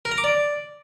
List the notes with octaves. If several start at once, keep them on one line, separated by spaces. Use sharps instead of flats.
A#4
A#5
D6
D5